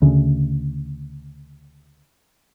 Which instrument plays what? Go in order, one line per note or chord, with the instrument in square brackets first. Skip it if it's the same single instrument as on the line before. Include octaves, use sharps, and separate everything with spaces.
[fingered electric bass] D2 C#3